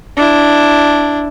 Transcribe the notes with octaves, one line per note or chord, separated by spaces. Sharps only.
D4 E4